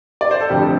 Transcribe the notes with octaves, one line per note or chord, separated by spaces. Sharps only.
D5
C5
A4
F1 F2 D3 G4